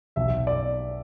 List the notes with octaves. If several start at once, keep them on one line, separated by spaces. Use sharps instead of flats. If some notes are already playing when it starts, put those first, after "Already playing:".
B1 E5
D5